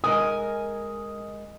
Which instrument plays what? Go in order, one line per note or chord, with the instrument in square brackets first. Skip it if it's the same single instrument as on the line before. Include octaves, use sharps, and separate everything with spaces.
[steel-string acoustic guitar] G#3 A#4 G#5 [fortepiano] D#6